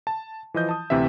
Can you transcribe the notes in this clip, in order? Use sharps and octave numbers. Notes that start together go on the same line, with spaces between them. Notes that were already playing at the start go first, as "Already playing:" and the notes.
A5
E3 F3 D#5 G6
A5 D#6
D2 C3 E3 C4 E5